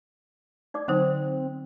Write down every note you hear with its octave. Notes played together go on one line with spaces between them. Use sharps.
D#4 D5 D6
D3 F#3 C4 D#4 C5